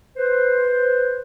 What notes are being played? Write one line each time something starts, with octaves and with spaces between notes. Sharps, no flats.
B4 C5